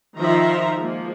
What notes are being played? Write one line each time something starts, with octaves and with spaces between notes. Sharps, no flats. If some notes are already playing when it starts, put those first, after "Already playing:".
D#3 F3 E5 A#5
F3 G#3 A#3